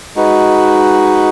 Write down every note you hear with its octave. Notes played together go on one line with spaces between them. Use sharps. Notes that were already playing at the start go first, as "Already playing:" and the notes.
G#3 D#4 F#4 B4